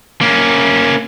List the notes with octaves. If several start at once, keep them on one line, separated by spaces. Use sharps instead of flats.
A#3 C#4